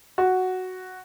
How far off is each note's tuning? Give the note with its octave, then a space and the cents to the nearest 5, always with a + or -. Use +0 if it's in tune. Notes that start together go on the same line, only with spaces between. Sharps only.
F#4 +0